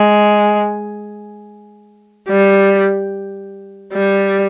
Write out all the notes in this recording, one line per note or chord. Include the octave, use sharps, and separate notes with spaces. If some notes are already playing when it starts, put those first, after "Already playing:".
Already playing: G#3
G3
G3